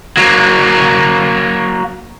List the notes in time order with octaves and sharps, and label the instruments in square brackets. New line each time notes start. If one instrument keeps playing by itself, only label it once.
[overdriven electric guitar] F#3 A#3